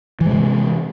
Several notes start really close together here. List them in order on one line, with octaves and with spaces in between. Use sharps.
E3 G#3 C3